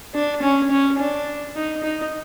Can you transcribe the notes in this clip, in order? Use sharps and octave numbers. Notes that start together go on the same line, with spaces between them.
D4
C#4
C#4
D4
D#4
D#4